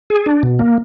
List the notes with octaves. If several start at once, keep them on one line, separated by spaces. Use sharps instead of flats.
G#4
D4
B2
A#3